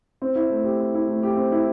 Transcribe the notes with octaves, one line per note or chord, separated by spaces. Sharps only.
C4
E4
A3
G4
C4
E4
A3
G4
C4
E4